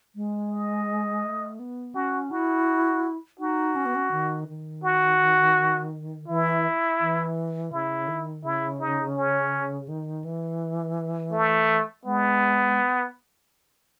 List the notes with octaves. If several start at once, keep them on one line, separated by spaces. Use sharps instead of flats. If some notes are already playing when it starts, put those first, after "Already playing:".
G#3
D#5
A3
B3
C#4 F#4
E4 F#4
D#4 F#4
C#4
B3
C#4
D#3
D#3
F#4
E3 E4
E3
C#3 E4
D#3
C#3 E4
D#4
C#4
D#3
E3
A3
G#3 B3